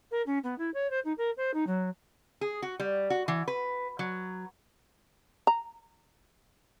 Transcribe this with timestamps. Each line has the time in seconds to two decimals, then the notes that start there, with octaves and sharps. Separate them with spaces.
0.11 A#4
0.26 C#4
0.43 B3
0.58 E4
0.74 C#5
0.90 C5
1.05 D#4
1.17 A#4
1.37 C5
1.54 D#4
1.67 F#3
2.41 G#4
2.62 F#4
2.80 G3
3.10 F#4
3.28 E3
3.48 B4
3.99 F#3
5.47 A#5